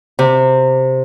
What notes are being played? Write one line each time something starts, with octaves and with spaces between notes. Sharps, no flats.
C3